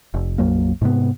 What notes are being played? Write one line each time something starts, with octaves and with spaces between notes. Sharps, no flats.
F1
A#1 F2 F#3 A#3
G#2 C3 B3